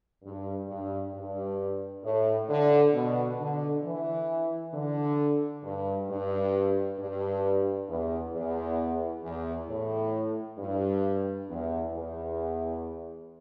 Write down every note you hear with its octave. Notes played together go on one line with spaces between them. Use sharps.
G2
G2
G2
A2
D3
B2
D3
E3
D3
G2
G2
G2
E2
E2
E2
A2
G2
E2
E2